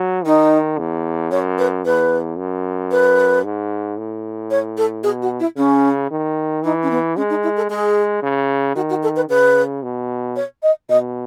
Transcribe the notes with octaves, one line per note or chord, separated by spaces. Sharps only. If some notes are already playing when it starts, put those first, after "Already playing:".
Already playing: F#3
D#3 D#4
E2
F#2 C#5
B4
E2 B4
F#2
B4
G#2
A2
C#5
A4
B2 G#4
F#4
E4
C#3 C#4
D#3
E3 D#4
C#4
B3
G#3 C#4
D#4
E4
A4
G#3 G#4
C#3
D#3 F#4
F#4
A4
B4
C#3 B4
B2
C#5
D#5
B2 D#5